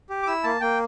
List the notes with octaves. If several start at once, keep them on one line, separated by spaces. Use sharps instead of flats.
G4
D6
E4 E6
A#3 A5
A#3 G5